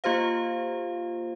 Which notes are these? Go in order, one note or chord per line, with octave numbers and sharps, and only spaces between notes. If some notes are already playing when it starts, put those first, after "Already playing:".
A#3 F4 G4 C5 F5